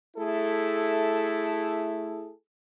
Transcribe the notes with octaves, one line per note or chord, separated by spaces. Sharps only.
A3 E4 G#4 A4